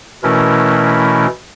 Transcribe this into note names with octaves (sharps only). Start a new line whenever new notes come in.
B2 E3 A3 C#4 E4 A#4